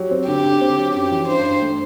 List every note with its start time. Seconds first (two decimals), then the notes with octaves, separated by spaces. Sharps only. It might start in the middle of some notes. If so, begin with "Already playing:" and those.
Already playing: F#3 G4
0.11 C4
0.27 D3 G4
0.44 D3
0.61 C4
0.78 F#3
0.94 F#2 G4
1.11 E3
1.28 G2 C5
1.45 G2
1.62 A3